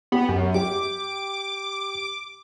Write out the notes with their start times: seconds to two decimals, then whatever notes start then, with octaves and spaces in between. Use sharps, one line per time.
0.12 B3 G4
0.28 F#2
0.54 G4 D6